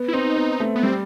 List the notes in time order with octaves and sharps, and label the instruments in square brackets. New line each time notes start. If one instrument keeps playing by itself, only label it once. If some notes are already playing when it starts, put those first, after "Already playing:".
Already playing: [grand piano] B3
[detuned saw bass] E4
[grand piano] C4 [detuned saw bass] D#4
[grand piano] B3
A3
[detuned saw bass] B3
[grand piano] G3 [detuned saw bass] C4